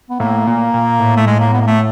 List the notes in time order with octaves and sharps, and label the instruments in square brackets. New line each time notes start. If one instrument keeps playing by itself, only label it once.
[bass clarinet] B3
[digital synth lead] A2 [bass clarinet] A#3
[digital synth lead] A#2
A#2
A2
[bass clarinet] A3
G#3
A#3
B3
A#3
A3